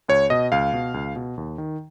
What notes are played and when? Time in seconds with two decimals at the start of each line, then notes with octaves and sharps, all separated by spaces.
0.08 C#2 C#5
0.30 B2 D#5
0.52 C#2 F5
0.73 B2
0.94 C#2
1.16 B2
1.37 D#2
1.58 D#3